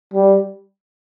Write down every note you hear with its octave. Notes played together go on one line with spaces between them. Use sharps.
G3